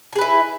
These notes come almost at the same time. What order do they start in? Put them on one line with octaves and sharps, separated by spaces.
G#5 G#4 B4 E4